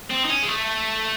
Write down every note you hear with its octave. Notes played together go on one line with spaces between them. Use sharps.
C4
D#4
C#4
G#3
A3